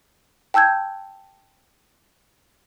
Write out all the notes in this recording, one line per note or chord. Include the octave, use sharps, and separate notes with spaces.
G5 A5 E6 G6 G#6